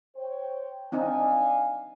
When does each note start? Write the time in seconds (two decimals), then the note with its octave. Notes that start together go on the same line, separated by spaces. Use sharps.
0.16 C5 C#5 G5
0.92 C4 D4 D#4 D5 F5 G#5